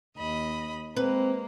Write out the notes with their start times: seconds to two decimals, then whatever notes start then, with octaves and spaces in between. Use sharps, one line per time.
0.18 D#2 D#5 B5
0.97 G#3 A#3 C4 B4